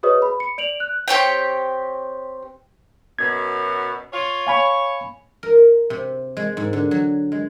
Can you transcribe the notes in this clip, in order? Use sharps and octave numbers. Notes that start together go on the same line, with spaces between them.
F#4 G#4 B4 C#5 D#5 D#6
B5
C#7
D5 D7 F7 F#7
F#6
C4 G4 C#5 G5
F#2 B2 G#6
F4 C#5
C#5 F5 G#5 B5
A#4
C3
G#3
G#2
D3
F#3
G#3